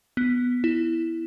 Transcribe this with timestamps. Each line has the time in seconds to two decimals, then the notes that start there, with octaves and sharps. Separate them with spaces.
0.17 B3
0.64 E4